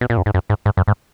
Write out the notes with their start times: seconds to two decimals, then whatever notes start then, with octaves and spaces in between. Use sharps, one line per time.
0.01 B2
0.10 A#2
0.17 F#2
0.26 G#2
0.34 F#2
0.50 G#2
0.66 G#2
0.77 F#2
0.88 G#2